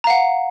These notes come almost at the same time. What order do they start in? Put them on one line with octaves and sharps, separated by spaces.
A#5 F5 F#5